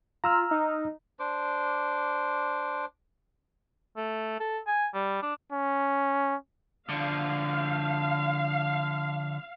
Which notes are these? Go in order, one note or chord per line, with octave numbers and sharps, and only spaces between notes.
F4 A#5 E6 F6
D#4
D4 C5 D6
A3
A4
G#5
G3
D4
C#4
D3 F3 F5